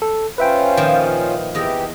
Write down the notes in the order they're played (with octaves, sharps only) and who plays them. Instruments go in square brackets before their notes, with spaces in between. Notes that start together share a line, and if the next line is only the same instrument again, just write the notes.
[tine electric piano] A4
[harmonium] C#4 F4 C5 [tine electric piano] B4 E5 G5
[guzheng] A#2 D#3 F3
[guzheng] E2 D#5 [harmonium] E3 G4